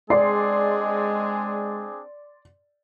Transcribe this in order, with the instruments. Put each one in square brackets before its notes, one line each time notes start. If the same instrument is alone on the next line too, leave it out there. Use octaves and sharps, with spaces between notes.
[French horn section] G#3 [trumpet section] C4 D4 G#4 [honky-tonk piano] D5 C6 C7